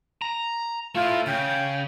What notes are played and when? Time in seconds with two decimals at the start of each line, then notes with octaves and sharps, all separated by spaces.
0.22 A#5
0.95 A3 E4 F4
1.27 C#3 G5